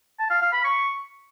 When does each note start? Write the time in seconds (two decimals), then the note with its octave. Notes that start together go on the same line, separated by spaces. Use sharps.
0.19 A5
0.30 F5
0.41 F5
0.53 B5
0.64 C#6